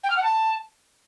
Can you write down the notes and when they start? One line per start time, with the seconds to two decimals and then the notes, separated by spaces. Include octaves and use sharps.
0.04 G5
0.10 F6
0.16 F#5
0.23 A5